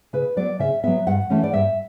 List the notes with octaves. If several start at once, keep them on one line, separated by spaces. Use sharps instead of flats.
C#3 B4
F#3 B3 D5
C#3 E5
F#3 B3 E5
G2 F#5
E3 A3 C#4
D5
G2 E5